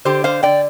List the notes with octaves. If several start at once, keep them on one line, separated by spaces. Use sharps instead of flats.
D3 G4 C5
C5 F5
D3 D5 G5